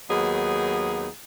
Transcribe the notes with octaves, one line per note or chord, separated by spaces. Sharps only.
D#2 F#3 B3 D#4 G#4